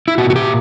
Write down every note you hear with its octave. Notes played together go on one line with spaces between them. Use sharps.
E4
A#2 F#4
F#4
G4